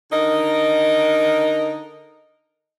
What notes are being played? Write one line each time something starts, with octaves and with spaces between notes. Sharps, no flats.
D3 D#4 A#4 D#5